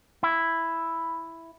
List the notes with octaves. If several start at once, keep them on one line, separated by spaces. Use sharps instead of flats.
E4